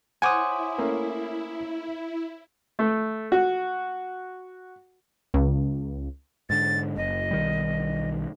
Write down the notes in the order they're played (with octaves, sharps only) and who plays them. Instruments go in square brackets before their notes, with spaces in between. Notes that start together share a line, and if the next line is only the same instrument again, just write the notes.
[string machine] E4 [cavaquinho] C5 C#5 F#5 [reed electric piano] G#5 D6 D#6
[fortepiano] A3 A#3 C#4
A3
F#4
[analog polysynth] C#2
[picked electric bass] G#2 D3 [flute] A6
[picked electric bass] F#1 [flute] D#5
[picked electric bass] B1 D#3 G3